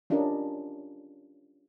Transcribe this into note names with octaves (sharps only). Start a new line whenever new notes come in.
C#4 D4 F4 G4 A#4 D#5